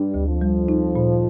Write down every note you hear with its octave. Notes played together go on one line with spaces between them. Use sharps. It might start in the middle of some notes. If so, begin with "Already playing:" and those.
Already playing: G2 G3 D4
D2
F2 F3
G3
D#4
A#2